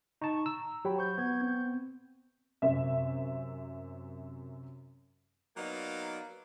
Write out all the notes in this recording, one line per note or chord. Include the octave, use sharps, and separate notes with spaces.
D#4 A5 C#6
A#5 E6
F#3 G4 G5 B5
C5 C#6 G6
B3 G#6
C4
F#2 C3 E5
F#3 A#3 B3 D#4 D5 F5